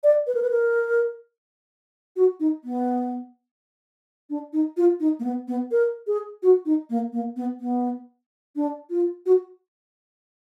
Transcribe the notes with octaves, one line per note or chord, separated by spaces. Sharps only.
D5
B4
A#4
B4
A#4
F#4
D#4
B3
D4
D#4
F4
D#4
A#3
B3
B3
A#4
G#4
F#4
D#4
A#3
A#3
B3
B3
D4
F4
F#4